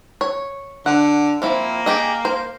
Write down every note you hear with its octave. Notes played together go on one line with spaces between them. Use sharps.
C#5
D3 F#5
F3 A#3 C4 E4
G4 G#4 D#5
C5